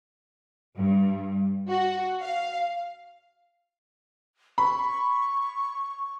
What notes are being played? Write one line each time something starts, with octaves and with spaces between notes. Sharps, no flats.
G2
F#4
F5
B5 C#6